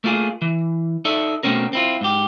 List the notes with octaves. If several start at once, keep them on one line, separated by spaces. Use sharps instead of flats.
A3 A#3 F4 F#4 G#4
E3
D#4 A4 D5 E5
B2 F#3 A3 C4 C#4 A#4
C4 E4 F4
G#2 G4